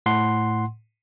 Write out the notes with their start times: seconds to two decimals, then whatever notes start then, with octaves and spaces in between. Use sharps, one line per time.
0.06 A2 F#5 C6